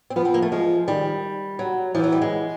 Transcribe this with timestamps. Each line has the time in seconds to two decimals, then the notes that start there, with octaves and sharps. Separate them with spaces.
0.10 C4
0.16 F3 B3
0.25 C4
0.34 A#3
0.42 A3
0.52 F3 G#3
0.88 D#3 G3
1.59 F#3
1.95 E3 F3
2.04 F#3
2.12 G3
2.21 G#3